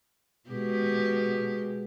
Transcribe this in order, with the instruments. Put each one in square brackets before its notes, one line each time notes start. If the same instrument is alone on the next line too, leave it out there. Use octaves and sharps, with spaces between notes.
[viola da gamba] B2 G#3 G4